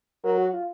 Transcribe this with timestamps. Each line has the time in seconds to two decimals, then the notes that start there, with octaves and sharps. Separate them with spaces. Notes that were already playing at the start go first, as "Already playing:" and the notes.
0.24 F#3 A#4
0.38 F#4
0.53 F4